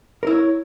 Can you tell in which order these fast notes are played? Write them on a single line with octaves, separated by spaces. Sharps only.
A#4 E4 C#5